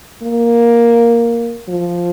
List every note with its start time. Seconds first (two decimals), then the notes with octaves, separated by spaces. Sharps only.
0.23 A#3
1.68 F3